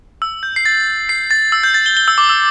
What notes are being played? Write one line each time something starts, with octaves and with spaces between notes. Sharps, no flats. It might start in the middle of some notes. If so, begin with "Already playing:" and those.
E6
G6
C7
A6
C7
A6
E6
G6
A6
G7
G7
E6
D6
E6